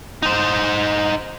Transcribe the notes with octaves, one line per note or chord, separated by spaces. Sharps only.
D#4 C5